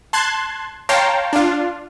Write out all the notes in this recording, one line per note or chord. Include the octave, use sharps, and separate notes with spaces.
A5 C6 F#6 G#6
C#5 F5 G5 A5 A#5 C6
D4 F4